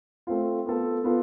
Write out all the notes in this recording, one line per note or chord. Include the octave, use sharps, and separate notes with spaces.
A3 C4 F4
B3 F4 A4
B3 F4 A4